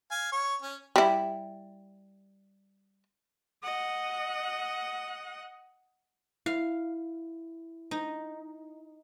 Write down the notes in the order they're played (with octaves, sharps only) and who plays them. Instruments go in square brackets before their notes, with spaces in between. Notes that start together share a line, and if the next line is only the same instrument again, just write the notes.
[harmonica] F5 G#5
C#5 C#6
C#4
[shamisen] G3 E4
[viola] D#5 F#5
[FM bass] E4 [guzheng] F5
[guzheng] D#4